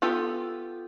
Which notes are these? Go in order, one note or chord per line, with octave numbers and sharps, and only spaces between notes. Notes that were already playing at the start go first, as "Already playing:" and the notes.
B3 F4 G4 A4